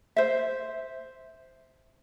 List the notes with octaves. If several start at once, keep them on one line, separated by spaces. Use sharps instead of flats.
C5 E5